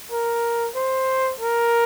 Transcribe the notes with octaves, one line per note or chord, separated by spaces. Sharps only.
A#4
C5
A#4